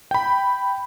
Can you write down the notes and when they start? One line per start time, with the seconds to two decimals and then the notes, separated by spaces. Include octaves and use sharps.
0.11 G5 B5